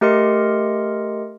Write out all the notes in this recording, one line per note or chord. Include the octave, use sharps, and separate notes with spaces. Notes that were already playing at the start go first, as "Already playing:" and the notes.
A3 G4 A#4 D#5 C6 C#7